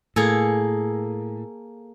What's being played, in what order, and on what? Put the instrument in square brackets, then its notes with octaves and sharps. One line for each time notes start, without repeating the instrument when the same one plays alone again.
[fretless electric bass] A2 [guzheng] A#3 G#4 A4